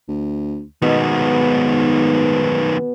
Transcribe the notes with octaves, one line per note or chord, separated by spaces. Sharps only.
D2
G#2 B2 D#3 B3